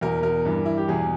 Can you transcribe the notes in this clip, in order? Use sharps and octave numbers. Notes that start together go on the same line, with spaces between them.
E2 B2 A#4
A#4
G2 E3
E4
G4
E2 B2 G#4